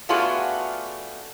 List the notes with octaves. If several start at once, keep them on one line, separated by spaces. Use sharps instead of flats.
A3 B3 D4 F4 F#4 G#4